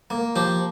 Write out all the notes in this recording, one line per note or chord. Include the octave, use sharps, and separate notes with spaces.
A#3
F3 G4